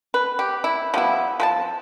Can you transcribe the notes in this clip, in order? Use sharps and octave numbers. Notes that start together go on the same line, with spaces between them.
B4
G4
E4
F3 G3 B3 E4
F3 B4 A5